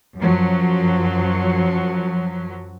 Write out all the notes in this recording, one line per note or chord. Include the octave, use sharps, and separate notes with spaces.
F#2 F3 F#3